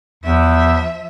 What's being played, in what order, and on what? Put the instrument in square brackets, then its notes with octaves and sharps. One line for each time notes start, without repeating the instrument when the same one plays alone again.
[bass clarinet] E2 [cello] F3 E5